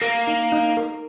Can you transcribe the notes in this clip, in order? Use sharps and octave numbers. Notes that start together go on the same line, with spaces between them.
A#3 A#4
D#4
D#4
A#4